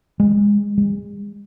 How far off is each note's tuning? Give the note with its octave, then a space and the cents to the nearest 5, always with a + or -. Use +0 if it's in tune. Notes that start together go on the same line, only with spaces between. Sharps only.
G#3 -20
G#3 -40